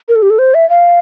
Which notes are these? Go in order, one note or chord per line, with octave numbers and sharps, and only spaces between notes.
A#4
A4
G4
A4
C5
E5
F5